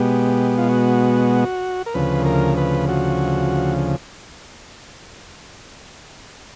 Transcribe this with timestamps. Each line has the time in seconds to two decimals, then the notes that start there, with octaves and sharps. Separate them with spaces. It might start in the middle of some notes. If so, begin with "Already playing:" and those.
Already playing: B2 G#3 B3 G4
0.58 F4
0.69 F#4
1.86 A#4
1.94 D2 C#3 F3 B4
2.25 A#4
2.57 B4
2.89 F#4